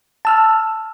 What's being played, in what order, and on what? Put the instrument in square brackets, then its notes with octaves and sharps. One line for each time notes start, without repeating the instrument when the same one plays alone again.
[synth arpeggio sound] A5 E6 F6